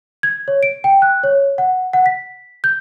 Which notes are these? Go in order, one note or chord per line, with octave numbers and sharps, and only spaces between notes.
G#6
C#5
D7
G5
F#6
C#5
F#5
F#5
B6
G6